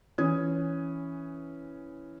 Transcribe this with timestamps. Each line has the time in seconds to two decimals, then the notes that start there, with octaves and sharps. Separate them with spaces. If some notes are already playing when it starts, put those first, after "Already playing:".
0.18 E3 C#4 D#6 G#6